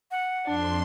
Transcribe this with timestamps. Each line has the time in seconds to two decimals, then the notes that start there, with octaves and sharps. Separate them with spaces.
0.11 F#5
0.46 F2 D4 C6